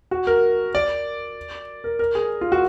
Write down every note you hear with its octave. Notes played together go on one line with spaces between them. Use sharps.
F#4
A#4
D5
A#4
A#4
G#4
F4
F#4